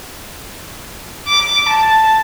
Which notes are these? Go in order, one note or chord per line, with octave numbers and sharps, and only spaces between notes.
D6
A5